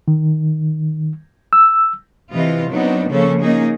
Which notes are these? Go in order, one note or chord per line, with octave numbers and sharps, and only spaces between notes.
D#3
E6
C3 E3 F4 D#5
F#3 B3 C4 D4 D#4
C#3 F3 A#3 C#4 A4
A#3 C#4 D#4 G#4